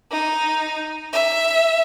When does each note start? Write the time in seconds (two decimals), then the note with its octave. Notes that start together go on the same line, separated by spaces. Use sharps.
0.11 D#4
1.13 E5